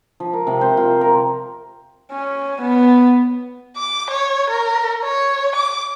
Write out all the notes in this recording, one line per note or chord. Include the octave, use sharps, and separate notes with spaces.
F3
A#4
C3
C5
F4
A#4
C#4
B3
D6
C#5
A#4
C#5
D6